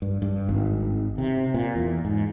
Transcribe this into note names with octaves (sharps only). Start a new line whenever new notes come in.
G2
G2
G#1
C3
A#2
E2
G#2